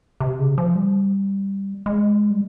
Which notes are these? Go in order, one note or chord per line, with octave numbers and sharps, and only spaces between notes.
C3
C#3
F3
G3
G#3
G3